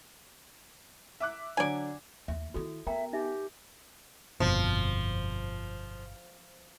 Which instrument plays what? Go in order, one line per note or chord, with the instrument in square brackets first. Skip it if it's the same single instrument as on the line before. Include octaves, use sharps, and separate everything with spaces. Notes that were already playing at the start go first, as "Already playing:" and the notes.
[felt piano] E5 D6 F#6
[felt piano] D3 F#3 D4 [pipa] D5 G#5
[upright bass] D#2 [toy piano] E5
[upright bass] D#3 E4 [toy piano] F#4 A4
[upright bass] B3 [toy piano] A#4 G5 A#5 [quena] E5
[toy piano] D#4 E5 [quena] G4
[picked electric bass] G1 F2 B2 [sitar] F3